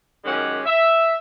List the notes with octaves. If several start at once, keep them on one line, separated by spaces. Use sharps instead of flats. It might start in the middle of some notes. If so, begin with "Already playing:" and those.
F#2 D#3 G#3 C#4 G4 F#5
E5